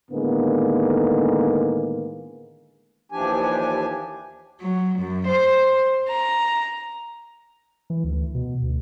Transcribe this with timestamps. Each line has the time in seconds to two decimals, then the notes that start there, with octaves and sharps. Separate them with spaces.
0.11 A2 D3 D#3 G#3 A#3 B3
3.12 D#2 E3 F3 D4 G4 G#5
4.60 F#3
4.99 F#2
5.28 C5
6.08 A#5
7.90 E3
8.04 D2
8.35 B2
8.62 D2